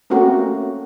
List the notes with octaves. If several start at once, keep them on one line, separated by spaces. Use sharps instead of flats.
A3 A#3 C4 C#4 F#4 G4